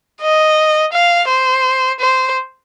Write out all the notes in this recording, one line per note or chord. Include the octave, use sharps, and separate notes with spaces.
D#5
F5
C5
C5